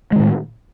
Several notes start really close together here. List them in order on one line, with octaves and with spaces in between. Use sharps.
G#3 D#3 A2